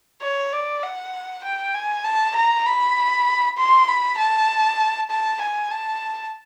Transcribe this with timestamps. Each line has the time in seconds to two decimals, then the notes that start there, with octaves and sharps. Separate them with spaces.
0.22 C#5
0.53 D5
0.83 F#5
1.44 G5
1.74 G#5
2.05 A5
2.35 A#5
2.66 B5
3.58 C6
3.88 B5
4.18 A5
5.10 A5
5.41 G#5
5.71 A5